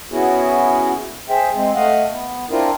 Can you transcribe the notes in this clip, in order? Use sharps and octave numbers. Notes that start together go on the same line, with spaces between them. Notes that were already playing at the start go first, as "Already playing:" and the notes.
B3 C#4 E4 F#4 G#4
G#4 C5 E5 G5
G#3 C4
A3 D#5 F5 F#5
B3
C4 D4 E4 F4 A#4